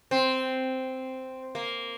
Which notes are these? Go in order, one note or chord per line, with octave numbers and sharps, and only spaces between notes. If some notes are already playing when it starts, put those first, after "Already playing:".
C4
A#3